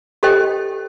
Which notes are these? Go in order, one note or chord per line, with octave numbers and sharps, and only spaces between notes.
G4 A4 C5 D#5 G5